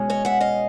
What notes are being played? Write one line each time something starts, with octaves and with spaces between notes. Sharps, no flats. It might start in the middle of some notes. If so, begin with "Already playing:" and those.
Already playing: B2 G#3 C#4
C#5 D#5
E5 F#5
D#5 F5